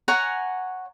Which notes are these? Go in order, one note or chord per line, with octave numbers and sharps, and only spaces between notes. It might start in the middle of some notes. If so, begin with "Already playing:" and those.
C#5 F#5 G#5 A#5